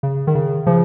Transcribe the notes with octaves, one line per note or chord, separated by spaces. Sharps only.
C#3
D#3
C#3
C#3 F3